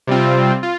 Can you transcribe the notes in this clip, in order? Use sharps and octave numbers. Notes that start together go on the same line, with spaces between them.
C3 G3 C4 F4
F4